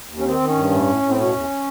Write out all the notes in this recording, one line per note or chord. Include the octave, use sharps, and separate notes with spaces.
D#2
C#4
D#3 C4
D#3
C#4
G2
A2
A2
A2
C4
B2 C#4
E2